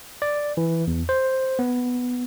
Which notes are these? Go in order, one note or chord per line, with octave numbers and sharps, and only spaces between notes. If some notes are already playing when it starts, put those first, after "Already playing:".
D5
E3
E2
C5
B3